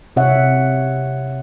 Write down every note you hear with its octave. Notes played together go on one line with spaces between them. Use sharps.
C3 C#5 E5 F#5